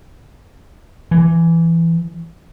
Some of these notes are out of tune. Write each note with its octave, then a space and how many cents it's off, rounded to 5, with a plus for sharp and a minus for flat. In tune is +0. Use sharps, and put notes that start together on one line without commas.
E3 +15